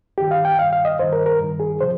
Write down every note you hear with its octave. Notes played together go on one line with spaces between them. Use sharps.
G2 D#3 G4
F5
G5
G2 D#3 F5
F5
D#5
G2 D#3 C5
A#4
A#4
G2
D#3
G#4
C3 F3 C5